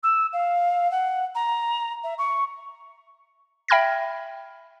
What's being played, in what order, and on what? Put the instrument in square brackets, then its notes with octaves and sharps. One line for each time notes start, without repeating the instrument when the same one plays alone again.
[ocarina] E6
F5
F#5
A#5
E5
C#6
[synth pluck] E5 G5 B5 F6 G#6 A#6